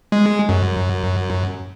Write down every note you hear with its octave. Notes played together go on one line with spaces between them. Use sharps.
G#3
F#2